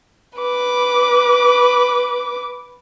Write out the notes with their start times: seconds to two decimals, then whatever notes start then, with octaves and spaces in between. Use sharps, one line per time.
0.38 B4 D6